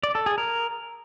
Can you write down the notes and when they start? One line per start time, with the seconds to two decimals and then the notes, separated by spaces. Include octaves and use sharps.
0.03 D5
0.15 A4
0.26 G#4
0.38 A#4